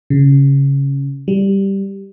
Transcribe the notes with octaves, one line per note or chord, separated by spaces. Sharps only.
C#3
G3